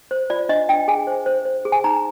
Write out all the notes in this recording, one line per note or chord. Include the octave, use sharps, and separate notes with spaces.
C5
F4 D5
D4 D#5
D4 G5
G#4 G#5
C5
C5
C5
G#4
G#5
D#4 A#5